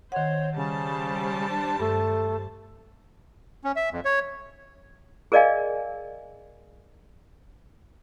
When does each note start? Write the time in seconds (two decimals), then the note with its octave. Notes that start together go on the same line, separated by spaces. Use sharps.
0.12 D#3 C4 C5 C#5 F#5
0.56 C#3 G3 C5 A5
1.50 D4
1.80 G2 A3
3.64 C#4
3.76 E5
3.92 F2
4.05 C#5
5.32 G#4 A#4 D5 D#5 F5 G#5